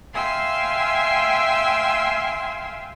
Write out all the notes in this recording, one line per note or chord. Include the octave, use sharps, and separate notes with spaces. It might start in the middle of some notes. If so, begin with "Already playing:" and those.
E5 F5 G5 G#5 C6 E6